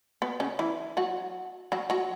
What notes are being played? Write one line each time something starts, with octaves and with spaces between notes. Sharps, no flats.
B3
C#3 C#4
E3 E4
F#3 F#4
F#3 F#4
F#3 F#4